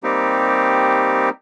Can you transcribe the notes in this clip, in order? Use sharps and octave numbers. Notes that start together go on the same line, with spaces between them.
G3 A#3 C4 D#4 G4